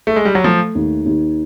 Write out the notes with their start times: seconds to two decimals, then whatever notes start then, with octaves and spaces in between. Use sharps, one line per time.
0.07 A3
0.16 G#3
0.25 G3
0.35 F#3
0.44 F3 A3
0.75 D#2
1.06 D#2